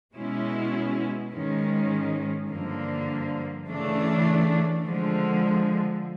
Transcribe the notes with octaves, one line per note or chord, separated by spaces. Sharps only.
B2 G#3 C#4 E4
G#2 D#3 G#3 C#4
G2 D3 F3 A#3
C#3 E3 A3 D4
D3 F3 G#3